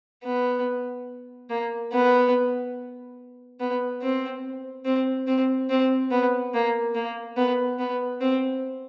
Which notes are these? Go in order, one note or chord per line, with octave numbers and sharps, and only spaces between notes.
B3
A#3
B3
B3
C4
C4
C4
C4
B3
A#3
A#3
B3
B3
C4